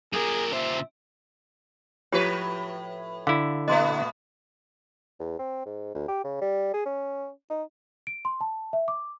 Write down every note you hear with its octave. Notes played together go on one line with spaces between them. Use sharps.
F#2 A#2 G4 G#4 A#4
C#3 C5 E5
A2 F3 F4 G4 B4 C#5
D3 E4 F5
A#2 A3 B3 D#5 C6
E2
C4
G#2
D2
G4
C#3
G3
G#4
C#4
D#4
D7
C6
A5
E5
D6